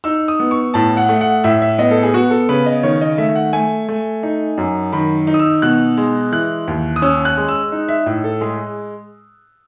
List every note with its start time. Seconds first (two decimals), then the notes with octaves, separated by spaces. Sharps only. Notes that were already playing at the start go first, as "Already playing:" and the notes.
0.04 D#4 E6
0.28 D#6
0.40 B3
0.51 C#6
0.74 A2 A5
0.97 F#5
1.09 A3
1.21 F#5
1.44 A2 E5
1.62 E5
1.79 B3 D#5
1.91 A4
2.03 G#4
2.14 B3 F#4
2.31 A4
2.49 C#3 B4
2.66 D#5
2.83 D#3 C#5
3.01 D#5
3.18 A3 E5
3.35 F#5
3.53 A3 G#5
3.89 A3
4.23 D#4
4.57 F#2
4.93 D#3 B5
5.27 D#4
5.34 D#6
5.39 E6
5.62 B2 F#6
5.97 G#3
6.32 E3 F#6
6.68 D#2
6.96 D#6
7.02 C#4 E6
7.25 F#6
7.37 G#3
7.49 E6
7.72 D#4
7.89 E5
8.06 A2
8.24 A4
8.41 G#3 G#4